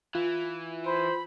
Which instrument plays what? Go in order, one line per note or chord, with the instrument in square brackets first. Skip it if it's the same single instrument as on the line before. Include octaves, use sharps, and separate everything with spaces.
[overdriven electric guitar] E3 [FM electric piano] F4
[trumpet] C5 [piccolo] B5